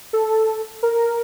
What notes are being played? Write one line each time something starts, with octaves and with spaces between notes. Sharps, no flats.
A4
A#4